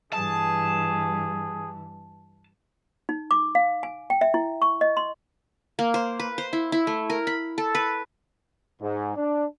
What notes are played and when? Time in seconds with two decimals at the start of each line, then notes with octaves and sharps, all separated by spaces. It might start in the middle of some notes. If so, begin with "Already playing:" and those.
0.13 G2 E3 G#4 A5
3.09 D#4
3.31 D6
3.55 F5
3.83 G#5
4.10 G5
4.21 E5
4.34 E4
4.62 C#6
4.81 D#5
4.97 C6
5.79 A#3
5.94 C5
6.20 B4
6.38 C5
6.53 E4
6.72 E4
6.87 A3
7.10 A#4
7.27 B5
7.58 A4
7.75 B4
8.81 G#2
9.16 D4